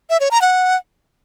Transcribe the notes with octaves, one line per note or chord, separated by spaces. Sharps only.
E5
C#5
A#5
F#5